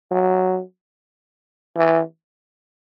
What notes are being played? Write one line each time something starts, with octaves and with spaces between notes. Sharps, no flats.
F#3
E3